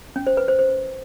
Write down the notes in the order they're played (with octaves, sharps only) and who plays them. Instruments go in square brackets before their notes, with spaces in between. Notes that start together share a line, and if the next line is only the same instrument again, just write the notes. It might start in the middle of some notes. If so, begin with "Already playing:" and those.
[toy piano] C#4
C5
B4
C5
C5